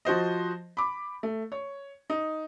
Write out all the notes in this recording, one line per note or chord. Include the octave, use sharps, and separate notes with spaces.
F3 F#4 C5 D#5
B5 D6
A3
C#5
D#4